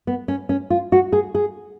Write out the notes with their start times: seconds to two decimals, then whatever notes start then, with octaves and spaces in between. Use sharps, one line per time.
0.07 B3
0.28 C#4
0.49 C#4
0.70 F4
0.92 F#4
1.13 G#4
1.35 G#4